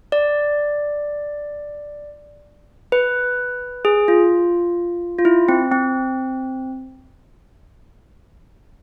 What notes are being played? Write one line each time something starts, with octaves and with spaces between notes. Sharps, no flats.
D5
B4
G#4
F4
F4
E4
C4
C4